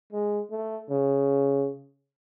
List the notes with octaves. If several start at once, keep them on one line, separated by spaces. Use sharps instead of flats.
G#3
A3
C#3